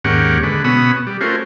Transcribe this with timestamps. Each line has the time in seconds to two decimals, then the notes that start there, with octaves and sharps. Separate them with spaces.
0.04 D#2 G#2 C#4 G4 A#4 F#5
0.43 D3 G#3 B4
0.64 B2 B3 C#4 B5 D#6 E6
1.07 G3
1.21 A3 C#4 F4 F#4 A#4 C5